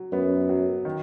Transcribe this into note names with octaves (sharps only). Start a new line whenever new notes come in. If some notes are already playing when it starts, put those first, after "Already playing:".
Already playing: F#3
F#2 B3
F#3
D#3